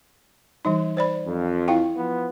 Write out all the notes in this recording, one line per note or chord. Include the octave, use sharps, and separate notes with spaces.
E3 G3 D#4
C5 D5 B5
F2
E4 F5 G5
F3 B3